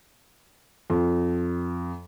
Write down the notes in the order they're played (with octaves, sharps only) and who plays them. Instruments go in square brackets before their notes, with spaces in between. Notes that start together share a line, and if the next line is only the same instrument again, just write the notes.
[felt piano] F2